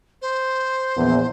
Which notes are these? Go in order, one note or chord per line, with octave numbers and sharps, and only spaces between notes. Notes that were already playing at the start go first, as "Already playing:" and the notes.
C5
A#1 E2